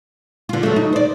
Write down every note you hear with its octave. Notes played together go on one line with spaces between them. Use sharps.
D3 F4
F#3 A3
D#4
C5 D5